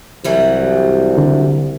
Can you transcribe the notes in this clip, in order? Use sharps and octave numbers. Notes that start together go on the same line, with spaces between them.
C2 E3 F#3 G3
D3